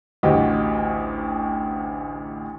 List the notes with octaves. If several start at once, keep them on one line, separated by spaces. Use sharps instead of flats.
A1 D2 F#4 G4 D#5